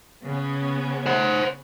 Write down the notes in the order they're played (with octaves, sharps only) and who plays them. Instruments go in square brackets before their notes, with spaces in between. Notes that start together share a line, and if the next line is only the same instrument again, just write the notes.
[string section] C#3 B3 C#4
[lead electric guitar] C5 F#5